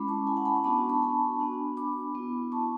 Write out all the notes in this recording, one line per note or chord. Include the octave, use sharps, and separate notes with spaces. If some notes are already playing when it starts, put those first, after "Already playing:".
Already playing: G#3 C#4 E4 B5 D6
A5 C#6
G#5 B5
F#5 A5
G#5 B5
A5 C#6
B3 D4 F#4 B5 D6
A5 C#6
G#5 B5
B3 D4 F#4
B5 D6
B3 E4
A5 C#6